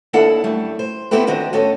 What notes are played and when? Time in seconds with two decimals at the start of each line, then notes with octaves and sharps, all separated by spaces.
0.13 D#2 A#3 D4 E4 A4 F#5
0.44 F#2 G3 A3
0.79 C5
1.11 B3 C4 E4 G4 A4 B4
1.27 D#3 C4 D4 F#4 D#5
1.53 A2 C#4 A4 D#5